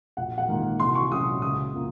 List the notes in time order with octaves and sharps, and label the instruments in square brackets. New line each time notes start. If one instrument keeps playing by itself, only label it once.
[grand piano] A#1 [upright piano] F#5
[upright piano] F#5
[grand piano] G#2 D#3 A#3 F4
[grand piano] C2 [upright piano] C6
[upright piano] C#6
[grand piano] A#2 F#3 C#4 F#4 [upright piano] D#6
[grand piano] C#2 [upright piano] D#6
[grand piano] C#3 F3 A#3